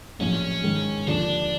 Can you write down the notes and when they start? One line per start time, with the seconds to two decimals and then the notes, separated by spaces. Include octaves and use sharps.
0.20 A#1 A2 F#3 C#4
0.63 G#2 D#3 G#3
1.07 D#2 D3 F3 D4